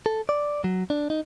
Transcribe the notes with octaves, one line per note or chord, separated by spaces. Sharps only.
A4
D5
F#3
D4
D#4